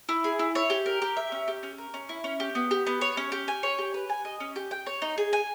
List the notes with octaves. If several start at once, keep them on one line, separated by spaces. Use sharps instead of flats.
E4
G#4
E4
C#5
G4
A#4
G4
E5
C#4
G4
C#4
A#4
C#4
E4
C#4
G4
B3
G4
B3
C#5
C#4
G4
G#5
C#5
G4
B4
G#5
D#5
C#4
G4
G5
C#5
D#4
G#4
G#5